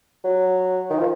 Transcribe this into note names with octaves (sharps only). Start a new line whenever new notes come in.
F#3
D#3
F3